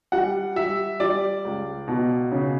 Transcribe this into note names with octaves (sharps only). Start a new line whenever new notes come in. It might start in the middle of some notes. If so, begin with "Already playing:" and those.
G3 F#5
G3 E5
G3 D5
C#2
B2
C#3